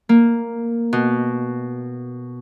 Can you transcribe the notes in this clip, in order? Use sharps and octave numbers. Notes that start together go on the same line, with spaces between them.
A#3
B2